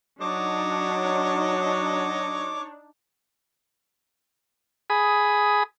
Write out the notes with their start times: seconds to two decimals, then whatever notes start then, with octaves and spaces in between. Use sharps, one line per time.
0.21 F#3 D4 D#4 C#5 D#5 D6
4.90 G#4 B5 D#6